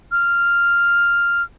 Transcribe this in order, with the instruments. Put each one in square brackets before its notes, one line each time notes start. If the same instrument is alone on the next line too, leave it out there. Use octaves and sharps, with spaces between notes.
[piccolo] F6